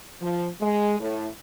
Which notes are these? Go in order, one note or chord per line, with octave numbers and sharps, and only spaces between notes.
F3
G#3
A2